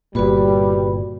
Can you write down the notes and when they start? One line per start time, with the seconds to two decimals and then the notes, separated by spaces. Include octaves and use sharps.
0.15 G1 A#2 G3 F#4 B4 B5